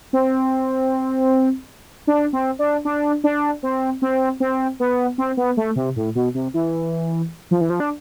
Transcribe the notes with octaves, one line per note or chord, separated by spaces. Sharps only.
C4
D4
C4
D4
D4
D4
C4
C4
C4
B3
C4
B3
A3
C3
A2
B2
C3
E3
F3
E3
F3
D4